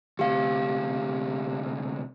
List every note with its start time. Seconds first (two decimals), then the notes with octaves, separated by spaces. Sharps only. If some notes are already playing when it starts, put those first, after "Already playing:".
0.19 D2 C3 G4 F5